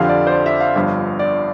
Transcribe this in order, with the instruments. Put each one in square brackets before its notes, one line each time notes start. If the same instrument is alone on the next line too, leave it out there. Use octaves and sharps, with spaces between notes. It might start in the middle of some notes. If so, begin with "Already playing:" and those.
Already playing: [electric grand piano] F2 D3 F3 C4 G4 [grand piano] F5
[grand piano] D5
C5
D5
E5
F5
[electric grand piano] G1 G2 F3
[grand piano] D5